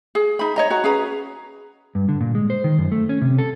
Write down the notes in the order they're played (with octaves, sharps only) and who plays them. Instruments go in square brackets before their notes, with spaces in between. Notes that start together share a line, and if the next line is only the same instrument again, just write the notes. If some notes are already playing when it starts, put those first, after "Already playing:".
[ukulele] G#4
D#4 B5
C#5 D#5 A#5
F#4 A#5
C#4 G#4 B4 A#5
[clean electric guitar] G2
D3
A#2
G#3
C5
D#3
F#2
A3
C#4
C3
A4